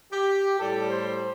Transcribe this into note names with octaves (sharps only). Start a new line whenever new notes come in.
G4
A2 G3 A4
C5